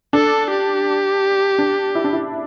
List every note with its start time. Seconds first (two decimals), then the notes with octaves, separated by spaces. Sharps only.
0.13 D4 A4
0.50 G4
1.58 D4
1.95 E4
2.04 D4
2.13 E4